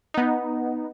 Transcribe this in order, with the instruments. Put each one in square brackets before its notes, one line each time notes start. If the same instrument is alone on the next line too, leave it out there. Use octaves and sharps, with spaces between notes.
[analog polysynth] B3 D#4